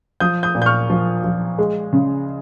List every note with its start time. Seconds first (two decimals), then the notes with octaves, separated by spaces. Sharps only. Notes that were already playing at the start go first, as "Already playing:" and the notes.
0.20 F3 D#6 G6
0.43 D#6 G6
0.55 A#2
0.62 G6
0.66 C#6 F6
0.90 F3
1.24 F3
1.58 G#3
1.93 C#3